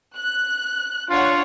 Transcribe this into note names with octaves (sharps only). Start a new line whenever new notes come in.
F#6
D4 F4 C#5 F#5